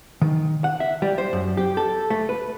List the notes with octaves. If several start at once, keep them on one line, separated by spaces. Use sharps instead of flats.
D#3
F#5
E5
G3
C5
F#2
G4
A4
A3
B4